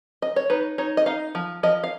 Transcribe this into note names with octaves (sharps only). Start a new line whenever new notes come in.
D#5
C#5
D#4 B4
D#4 C#5
D#5
D#4 F5
F3
F3 D#5
F5